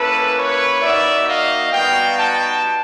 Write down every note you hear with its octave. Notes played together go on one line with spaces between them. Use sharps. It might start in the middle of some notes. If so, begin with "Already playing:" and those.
Already playing: A#3 C#4 E4 A4 B4
B4 C#5
A#3 D#4 F#4 D5 E5
D#5 F5
G3 B3 D#4 F#4 F5 G5
G5 A5